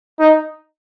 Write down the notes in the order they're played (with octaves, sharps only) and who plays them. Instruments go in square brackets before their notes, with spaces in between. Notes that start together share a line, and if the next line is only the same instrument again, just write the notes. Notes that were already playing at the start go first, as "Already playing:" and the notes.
[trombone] D#4